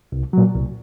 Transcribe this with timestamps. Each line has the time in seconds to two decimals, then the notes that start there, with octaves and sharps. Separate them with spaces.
0.12 C2
0.33 A#2 F#3
0.55 C2